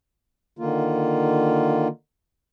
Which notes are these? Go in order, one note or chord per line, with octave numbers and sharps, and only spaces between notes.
D3 D#3 A#3 F4